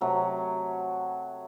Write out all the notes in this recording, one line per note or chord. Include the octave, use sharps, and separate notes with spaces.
C3 F#3 A3